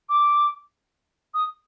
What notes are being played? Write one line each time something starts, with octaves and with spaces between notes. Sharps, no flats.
D6
D#6